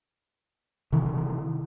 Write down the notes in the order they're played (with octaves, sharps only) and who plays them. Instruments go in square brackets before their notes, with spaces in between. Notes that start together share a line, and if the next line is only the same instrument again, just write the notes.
[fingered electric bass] C3 D#3 E3